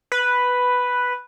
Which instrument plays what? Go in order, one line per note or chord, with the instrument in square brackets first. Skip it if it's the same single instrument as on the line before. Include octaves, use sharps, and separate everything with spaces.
[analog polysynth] B4